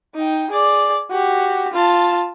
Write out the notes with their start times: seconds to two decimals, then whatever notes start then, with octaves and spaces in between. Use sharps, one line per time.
0.15 D#4 G5
0.51 G#4 D5
1.11 F#4 G4
1.73 F4 A5